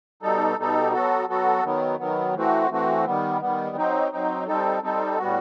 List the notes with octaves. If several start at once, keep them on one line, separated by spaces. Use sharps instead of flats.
B2 G3 D#4 A4
B2 G3 D#4 A4
F#3 B3 F#4 A4
F#3 B3 F#4 A4
D#3 F#3 B3
D#3 F#3 B3
E3 A3 C4 F#4
E3 A3 C4 F#4
D#3 G3 B3
D#3 G3 B3
F#3 C4 D#4
F#3 C4 D#4
G3 C4 D#4 A4
G3 C4 D#4 A4
A2 G3 B3 F#4